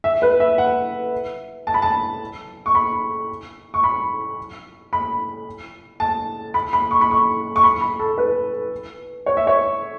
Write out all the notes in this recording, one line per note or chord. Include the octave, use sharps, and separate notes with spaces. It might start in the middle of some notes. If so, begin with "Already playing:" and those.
E5
B4
E5
F#5
A5
B5
A5
C#6
B5
C#6
B5
B5
A5
B5
B5
C#6
B5
C#6
C#6
B5
B5
A4
B4
C#5
E5
C#5